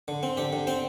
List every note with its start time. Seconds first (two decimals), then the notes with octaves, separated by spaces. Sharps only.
0.08 D3
0.23 C4
0.37 D3 G4
0.53 D3
0.67 C4 C5